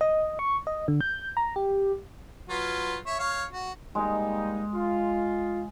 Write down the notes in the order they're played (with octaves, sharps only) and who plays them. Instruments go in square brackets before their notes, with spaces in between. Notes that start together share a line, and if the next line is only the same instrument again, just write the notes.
[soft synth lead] D#5
C#6
D#5
D3
G6
A#5
G4
[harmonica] F#3 F4 B4
C#5 E5
C#5 F5
F#4
[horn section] G3 A#3 D#4 [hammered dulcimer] G#3
[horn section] F4